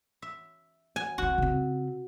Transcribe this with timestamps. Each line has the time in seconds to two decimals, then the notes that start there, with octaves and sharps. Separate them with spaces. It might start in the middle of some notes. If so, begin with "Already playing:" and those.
0.22 E5
0.96 G#5
1.18 D3 C4 F#4
1.38 C#3 C4